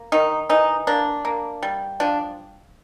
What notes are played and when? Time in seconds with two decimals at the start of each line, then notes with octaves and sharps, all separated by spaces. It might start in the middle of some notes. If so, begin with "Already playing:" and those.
Already playing: A#3
0.12 D#3 D#4
0.49 E3 D#4
0.87 A#3 D4
1.25 A#3
1.63 G3
2.00 F3 D4